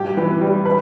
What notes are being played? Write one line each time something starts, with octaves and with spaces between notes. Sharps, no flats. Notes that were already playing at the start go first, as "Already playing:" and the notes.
Already playing: G2 G4
E3
G3
B4